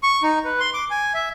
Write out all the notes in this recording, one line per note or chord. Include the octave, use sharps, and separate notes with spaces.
C#6
D#4
B4
C6
D6
G#5
E5